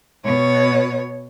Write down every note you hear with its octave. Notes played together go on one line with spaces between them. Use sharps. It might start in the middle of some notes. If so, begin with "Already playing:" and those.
B2 C#5